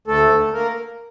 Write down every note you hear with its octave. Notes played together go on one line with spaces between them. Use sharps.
D2 A3 A4
D3 A3
A#3 A#4